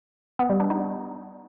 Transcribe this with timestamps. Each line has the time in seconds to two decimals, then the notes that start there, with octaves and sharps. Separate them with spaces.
0.39 B3
0.50 G3
0.60 D4
0.70 D#4